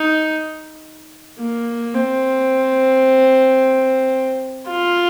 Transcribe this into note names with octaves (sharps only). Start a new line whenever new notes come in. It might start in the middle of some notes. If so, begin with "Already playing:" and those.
Already playing: D#4
A#3
C4
F4